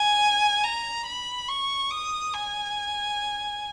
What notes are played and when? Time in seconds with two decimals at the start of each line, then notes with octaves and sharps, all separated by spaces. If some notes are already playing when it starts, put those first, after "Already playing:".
Already playing: G#5
0.64 A#5
1.06 B5
1.48 C#6
1.91 D#6
2.34 G#5